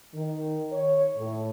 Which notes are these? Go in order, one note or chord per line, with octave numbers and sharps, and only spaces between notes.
D#3
C#5
A2